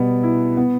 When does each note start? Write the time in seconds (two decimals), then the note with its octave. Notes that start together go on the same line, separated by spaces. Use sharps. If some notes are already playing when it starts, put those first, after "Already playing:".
Already playing: B2 G3 B3
0.23 E4
0.57 B3